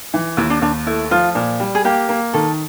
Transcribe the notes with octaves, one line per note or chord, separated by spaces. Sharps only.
E3
D#2 E4
D4
D#2 D4
A3 E4
F3 F4
A#2
G3
G#4
A#3 G4
A#3
D#3 A4